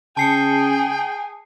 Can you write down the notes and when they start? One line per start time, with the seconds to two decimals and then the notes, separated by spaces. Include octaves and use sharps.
0.17 C#3 G#4 G5 A5 C7 C#7